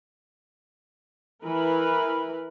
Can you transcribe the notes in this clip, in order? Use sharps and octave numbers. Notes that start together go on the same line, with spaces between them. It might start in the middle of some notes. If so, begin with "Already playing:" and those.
E3 A#4 B4 B5